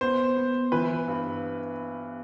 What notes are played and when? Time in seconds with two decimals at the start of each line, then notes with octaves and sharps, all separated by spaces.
0.01 B3 C5
0.36 B3
0.72 E3 B4
1.08 G2